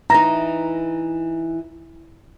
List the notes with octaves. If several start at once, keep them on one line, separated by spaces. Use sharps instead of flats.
E3 D#4 A#5